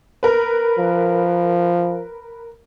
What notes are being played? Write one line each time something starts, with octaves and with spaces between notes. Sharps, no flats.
A#4 B4
F3